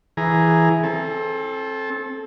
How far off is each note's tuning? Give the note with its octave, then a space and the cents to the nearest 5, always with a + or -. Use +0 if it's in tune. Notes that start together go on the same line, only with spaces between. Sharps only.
E3 +0 G#4 +0 A#5 +5
C4 +30 A4 -15